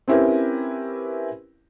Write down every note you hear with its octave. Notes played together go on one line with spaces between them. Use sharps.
C4 C#4 E4 G4 A#4 B4